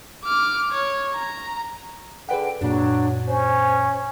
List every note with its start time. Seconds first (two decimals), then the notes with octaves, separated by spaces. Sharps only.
0.25 D6 F6
0.71 C#5
1.14 A#5
2.29 D3 G#4 B4 F#5 G5
2.61 F#2 A#2 F#3 D4
3.27 C#4 C5